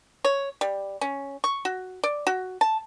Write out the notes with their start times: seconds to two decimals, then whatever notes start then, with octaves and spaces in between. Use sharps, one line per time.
0.25 C#5
0.61 G3
1.01 C#4
1.44 C#6
1.65 F#4
2.04 D5
2.27 F#4
2.61 A5